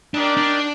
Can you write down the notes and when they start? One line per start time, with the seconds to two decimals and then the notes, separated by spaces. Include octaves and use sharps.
0.14 D4 D#4 G4 A#4 D5
0.37 D4